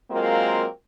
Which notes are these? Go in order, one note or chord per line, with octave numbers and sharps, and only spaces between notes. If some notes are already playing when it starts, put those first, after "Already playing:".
F#3 G#3 A#3 C4 F4 A#4